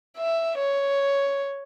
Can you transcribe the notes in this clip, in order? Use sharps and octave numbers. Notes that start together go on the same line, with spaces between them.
E5
C#5